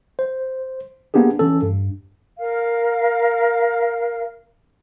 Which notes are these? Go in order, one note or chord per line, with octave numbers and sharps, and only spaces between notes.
C5
A#3 B3 D4 G4 G#4
E3 C#4 A4
G2
A#4 F5